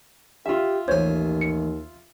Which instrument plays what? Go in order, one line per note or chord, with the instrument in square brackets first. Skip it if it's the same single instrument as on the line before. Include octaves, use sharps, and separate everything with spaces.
[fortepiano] F4 E5 [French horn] G4
[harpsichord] A1 G#5 [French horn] D#2 [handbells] C5 C#5
[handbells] C#7